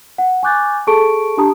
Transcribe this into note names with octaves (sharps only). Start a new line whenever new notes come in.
F#5
G#5 C#6 D6 F#6 G6 A6
G#4 A4 A5 C#6 D7
D4 G4 A5 A#5 D#6